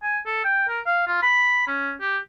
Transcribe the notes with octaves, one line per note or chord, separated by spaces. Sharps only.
G#5
A4
G5
A#4
F5
F4
B5
C#4
G4